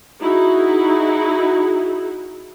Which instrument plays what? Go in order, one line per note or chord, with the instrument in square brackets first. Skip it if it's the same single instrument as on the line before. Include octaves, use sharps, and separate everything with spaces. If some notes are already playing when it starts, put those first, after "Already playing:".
[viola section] D#4 E4 F#4 G#4